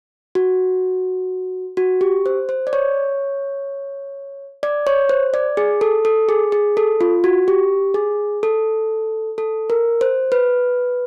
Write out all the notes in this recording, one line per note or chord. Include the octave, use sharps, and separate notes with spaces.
F#4
F#4
G4
C5
C5
D5
C#5
D5
C#5
C5
D5
G#4
A4
A4
G#4
G#4
A4
F4
F#4
G4
G#4
A4
A4
A#4
C5
B4